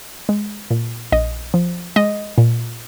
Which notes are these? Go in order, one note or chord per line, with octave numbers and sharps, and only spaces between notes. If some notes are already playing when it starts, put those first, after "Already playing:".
G#3
A#2
A#1 D#5
F3
G#3 D#5
A#2